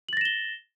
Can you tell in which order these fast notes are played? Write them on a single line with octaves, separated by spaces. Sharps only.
F#7 A6 A#6 E7 G7